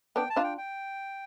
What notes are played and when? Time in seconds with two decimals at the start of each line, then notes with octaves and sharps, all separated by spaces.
0.16 B3 D4 G5
0.30 A5
0.36 D4 F4
0.44 G5
0.58 G5